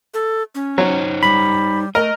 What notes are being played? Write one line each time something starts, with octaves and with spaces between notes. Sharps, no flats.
A4
C#4
F#3 D#4 C5 C#5
G3 B5
A3 A#4 D#5